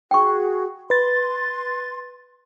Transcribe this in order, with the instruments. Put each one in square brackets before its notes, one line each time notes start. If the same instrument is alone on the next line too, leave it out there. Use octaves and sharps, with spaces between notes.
[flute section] F#4 G#4 [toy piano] G5 C#6
[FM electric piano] B4 A6 [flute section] C6